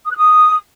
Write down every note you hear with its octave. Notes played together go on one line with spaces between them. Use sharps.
D#6
F#6
D#6